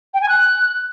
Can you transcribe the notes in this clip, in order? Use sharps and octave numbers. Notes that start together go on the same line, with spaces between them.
G5
G#5
F#6